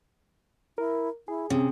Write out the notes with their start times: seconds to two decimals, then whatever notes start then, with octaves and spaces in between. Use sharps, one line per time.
0.78 E4 A#4
1.28 E4 G#4
1.50 C3 C#4 G#4